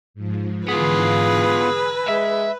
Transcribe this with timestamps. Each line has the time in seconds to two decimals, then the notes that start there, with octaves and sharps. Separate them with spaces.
0.14 G#2 F3
0.69 G#2 D3 E3 B3 F4 G#4 B4
1.44 G#5 A#5 E6
2.09 G#3 E5